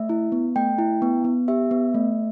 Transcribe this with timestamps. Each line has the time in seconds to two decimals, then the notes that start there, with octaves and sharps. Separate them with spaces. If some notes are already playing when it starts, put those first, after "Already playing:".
Already playing: A3 E5
0.09 E4
0.32 B3
0.56 A3 G5
0.79 E4
1.02 B3
1.24 B3
1.48 G4 E5
1.71 B3
1.94 A3